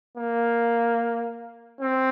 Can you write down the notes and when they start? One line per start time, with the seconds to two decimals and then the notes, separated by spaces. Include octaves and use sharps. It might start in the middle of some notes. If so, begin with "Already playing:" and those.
0.17 A#3
1.81 C4